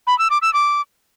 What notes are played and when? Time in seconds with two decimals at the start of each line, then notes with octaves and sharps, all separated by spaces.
0.07 B5
0.19 E6
0.30 D6
0.42 E6
0.53 D6